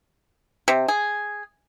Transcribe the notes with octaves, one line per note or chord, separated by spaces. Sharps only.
C3
G#4